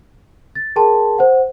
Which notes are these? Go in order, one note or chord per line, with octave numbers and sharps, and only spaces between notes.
A6
G#4 A#4 G5 A5 C6
C5 F#5